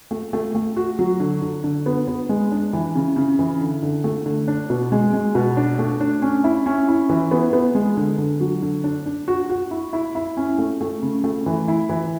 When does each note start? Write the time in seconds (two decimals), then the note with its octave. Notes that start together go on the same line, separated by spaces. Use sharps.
0.11 A3
0.33 A3
0.55 A3
0.77 F#4
0.99 F#3
1.20 D3
1.42 D3
1.64 D3
1.86 B3
2.08 B3
2.29 G#3
2.52 D4
2.73 E3
2.95 C#3
3.16 C#3
3.39 E3
3.61 D3
3.83 D3
4.04 A3
4.26 D3
4.48 D4
4.70 B2
4.92 G#3
5.13 G#3
5.35 B2
5.57 D4
5.79 A3
6.00 D4
6.22 C#4
6.44 E4
6.66 C#4
6.88 E4
7.09 E3
7.31 B3
7.53 B3
7.75 G#3
7.97 D3
8.18 D3
8.40 F#3
8.62 D3
8.84 D4
9.06 D4
9.28 F#4
9.50 F#4
9.71 E4
9.93 E4
10.15 E4
10.37 C#4
10.58 A3
10.81 A3
11.02 C#3
11.24 A3
11.46 E3
11.68 E4
11.89 E3